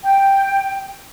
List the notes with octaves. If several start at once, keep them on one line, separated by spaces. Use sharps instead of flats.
G5